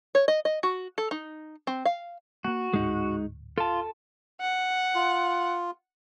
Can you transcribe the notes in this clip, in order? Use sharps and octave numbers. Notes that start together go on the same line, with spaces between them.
C#5
D#5
D#5
F#4
A4
D#4
C4
F5
A3 A#3 F#4
D1 G#2 G#3 D#4
F4 A4 A5
F#5
F4